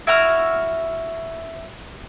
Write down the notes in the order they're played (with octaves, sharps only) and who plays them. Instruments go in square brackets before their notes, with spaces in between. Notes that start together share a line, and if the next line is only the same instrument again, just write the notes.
[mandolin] E4 F#4 F6